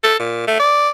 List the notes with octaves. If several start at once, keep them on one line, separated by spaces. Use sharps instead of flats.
A4
A#2
A3
D5